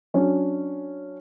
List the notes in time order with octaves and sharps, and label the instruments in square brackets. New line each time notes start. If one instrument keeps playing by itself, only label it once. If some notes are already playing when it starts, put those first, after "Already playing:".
[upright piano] F#3 C#4 D4